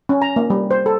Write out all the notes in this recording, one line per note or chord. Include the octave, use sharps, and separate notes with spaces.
C#4
A#5
A#3
G3
C5
A4